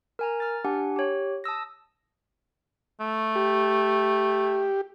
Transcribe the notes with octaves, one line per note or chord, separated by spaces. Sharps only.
A#4 G#5 A#5
F6 A6
D4 G4 F#5 G#5
G4 C#5
A5 D#6 E6 A#6
A3
G4